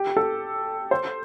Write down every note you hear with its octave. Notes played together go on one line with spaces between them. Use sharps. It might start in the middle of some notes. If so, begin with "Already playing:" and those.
Already playing: G4
A4
C5